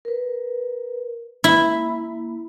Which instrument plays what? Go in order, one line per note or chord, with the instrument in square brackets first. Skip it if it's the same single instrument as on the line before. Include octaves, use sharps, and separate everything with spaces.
[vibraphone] A#4 B4
[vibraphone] A#3 [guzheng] E4